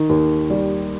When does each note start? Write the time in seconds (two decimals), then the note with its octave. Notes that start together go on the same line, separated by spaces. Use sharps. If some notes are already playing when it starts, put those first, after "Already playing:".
Already playing: D#3
0.09 D#2
0.50 G3